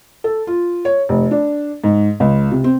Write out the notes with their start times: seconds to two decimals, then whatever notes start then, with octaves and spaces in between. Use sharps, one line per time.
0.24 A4
0.47 F4
0.85 C#5
1.09 F1
1.31 D4
1.84 G#2
2.20 C#2
2.51 C3
2.64 C4